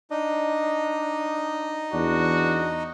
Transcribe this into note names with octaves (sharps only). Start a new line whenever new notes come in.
D4 D#4 D#5
E2 D4 F#4